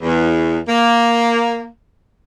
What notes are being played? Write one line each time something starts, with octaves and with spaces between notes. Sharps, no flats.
E2
A#3